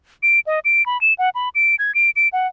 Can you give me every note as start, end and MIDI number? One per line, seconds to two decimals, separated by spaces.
0.23 0.40 98
0.47 0.60 75
0.65 0.85 98
0.86 1.00 83
1.01 1.14 100
1.19 1.30 78
1.35 1.49 83
1.55 1.75 98
1.79 1.94 92
1.95 2.10 98
2.16 2.28 98
2.33 2.47 78